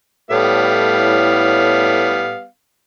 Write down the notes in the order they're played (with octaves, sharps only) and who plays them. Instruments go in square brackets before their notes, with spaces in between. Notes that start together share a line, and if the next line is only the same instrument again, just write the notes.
[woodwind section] A2 [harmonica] G3 B3 F5